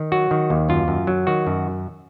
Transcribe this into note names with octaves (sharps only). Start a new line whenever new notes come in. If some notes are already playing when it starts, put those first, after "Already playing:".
Already playing: D#3
F#3 F#4
D#3
D#2
F#2 F4
F#2
F#3
D#3 F#4
F#2